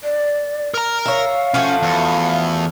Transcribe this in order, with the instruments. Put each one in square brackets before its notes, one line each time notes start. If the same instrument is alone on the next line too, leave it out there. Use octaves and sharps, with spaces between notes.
[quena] D5
[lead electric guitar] A#4 A#5
[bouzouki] C#5 E5 [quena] F5
[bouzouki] F3 A3 F#4 [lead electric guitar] C#4
[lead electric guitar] E2